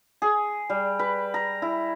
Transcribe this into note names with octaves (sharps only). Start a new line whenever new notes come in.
G#4
G3
B4
A#5
E4